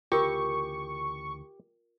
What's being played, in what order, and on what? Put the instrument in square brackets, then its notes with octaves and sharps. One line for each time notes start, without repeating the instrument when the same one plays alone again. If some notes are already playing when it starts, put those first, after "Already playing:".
[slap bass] D2 C#3 E3 [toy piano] F4 A#4 [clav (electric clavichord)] G4 [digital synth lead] C#6